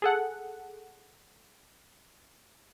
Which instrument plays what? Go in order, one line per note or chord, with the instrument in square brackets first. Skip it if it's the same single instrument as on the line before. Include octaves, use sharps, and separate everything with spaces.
[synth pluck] G#4 A4 F#5